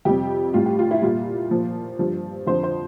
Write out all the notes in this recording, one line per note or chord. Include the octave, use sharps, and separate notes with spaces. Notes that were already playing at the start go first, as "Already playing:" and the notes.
F2 C3 G3 G4
A2 G3 F4
G4
F4
E4
A#2 G3 F4
A#2 F3
G2 F3
F2 D3 F3 C5
C5